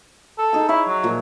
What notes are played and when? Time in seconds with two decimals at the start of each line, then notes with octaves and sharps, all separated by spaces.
0.39 A4
0.53 D#4 G#4 G#5
0.69 E4 C#5 E5 G#5
0.87 F#3
1.03 A#2 F3